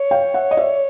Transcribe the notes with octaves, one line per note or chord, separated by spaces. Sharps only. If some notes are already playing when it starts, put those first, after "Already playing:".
Already playing: C#5
F5 G5
E5 F#5
D#5
D5 E5